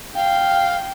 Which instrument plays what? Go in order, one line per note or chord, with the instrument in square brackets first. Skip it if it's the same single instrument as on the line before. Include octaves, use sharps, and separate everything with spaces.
[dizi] F5 [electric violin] G5